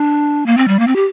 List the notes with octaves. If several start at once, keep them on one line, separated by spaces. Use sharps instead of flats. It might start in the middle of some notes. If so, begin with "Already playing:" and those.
Already playing: D4
A#3
C4
G3
A#3
C4
G4